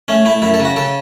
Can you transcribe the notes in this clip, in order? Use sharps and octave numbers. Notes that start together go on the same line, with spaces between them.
A3 C#4
A3 E4
F#2 E4
A4
C#3
F#4
C#3 A4